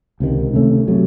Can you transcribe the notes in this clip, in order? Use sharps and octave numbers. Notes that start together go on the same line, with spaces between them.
C#2 C3 D#3
C3 D#3 A3 C#4
C3 F#3 A3